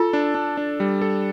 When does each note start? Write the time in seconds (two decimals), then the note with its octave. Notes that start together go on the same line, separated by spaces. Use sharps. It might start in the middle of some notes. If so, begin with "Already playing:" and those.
Already playing: F4 A4
0.13 D4
0.35 D4
0.57 D4
0.80 G3
1.01 A4